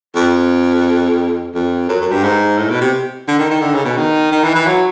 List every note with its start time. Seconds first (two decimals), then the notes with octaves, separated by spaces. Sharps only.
0.16 F2
1.55 F2
1.89 F#2
2.01 F#2
2.12 G2
2.24 G#2
2.58 A2
2.70 B2
2.81 C3
3.28 D3
3.39 D#3
3.51 D#3
3.62 D3
3.74 C#3
3.85 B2
3.97 D#3
4.32 D#3
4.44 E3
4.55 E3
4.66 F#3